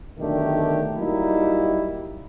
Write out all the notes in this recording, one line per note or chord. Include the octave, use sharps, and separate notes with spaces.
B1 D3 D#3 A3 D4 G4
F#3 G3 A#3 D#4 E4